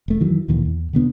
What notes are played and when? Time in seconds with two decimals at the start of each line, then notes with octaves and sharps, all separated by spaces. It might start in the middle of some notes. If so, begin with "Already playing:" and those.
0.08 E1 A3
0.20 F#2 D#3 E3 F#3
0.48 D2 A#2 D#3 E3
0.65 E2
0.93 B2 D3 B3 D4